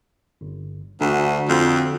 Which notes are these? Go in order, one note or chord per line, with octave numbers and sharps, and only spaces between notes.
G1
D2 D3 D4 F#4
F2